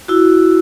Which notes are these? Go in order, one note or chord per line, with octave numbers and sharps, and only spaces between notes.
E4 F#4